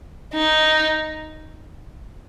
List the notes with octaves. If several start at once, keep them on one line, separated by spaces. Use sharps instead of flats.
D#4